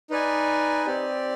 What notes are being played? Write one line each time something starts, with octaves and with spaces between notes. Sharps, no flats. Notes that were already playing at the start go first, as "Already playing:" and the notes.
D#4 B4 D5 G#5
C4 G4 D5